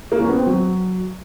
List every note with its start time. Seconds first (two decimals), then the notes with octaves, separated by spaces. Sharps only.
0.12 A#3
0.20 C#4
0.29 B3
0.38 C4
0.46 F#3